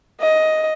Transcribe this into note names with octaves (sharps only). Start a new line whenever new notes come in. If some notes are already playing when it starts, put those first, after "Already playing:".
D#5